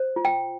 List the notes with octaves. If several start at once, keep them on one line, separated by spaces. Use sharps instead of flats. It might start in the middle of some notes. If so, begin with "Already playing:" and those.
Already playing: C5
F4
G5